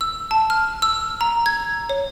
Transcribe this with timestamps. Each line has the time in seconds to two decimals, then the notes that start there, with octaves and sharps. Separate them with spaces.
0.01 E6
0.31 A5
0.50 F6
0.82 E6
1.21 A#5
1.46 G#6
1.89 C#5